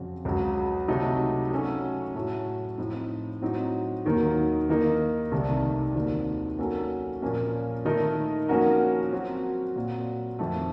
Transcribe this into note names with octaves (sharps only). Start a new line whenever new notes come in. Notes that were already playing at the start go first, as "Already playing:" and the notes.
Already playing: F2 C#3 F#3 C4
C#2 C#3 F#3
C3 F#3 A3 D#4
F#3 A3 C#4 A4
A2 F#3 A3
A2 F3 C4 D#4
A2 F#3 C4 D#4
D#2 D#3 F#3 A#3 D#4
D#3 A#3 D#4
C2 C3 D#3 A3
D#2 D#3 F#3 C4 F4
F#3 A#3 C#4 A4
A#2 F3 A#3 C#4
D#3 A3 D#4 A#4 D#5
F3 A#3 C#4 F#4 A#4
F#3 C4 F#4
A#2 F#3 C4
F2 D#3 A3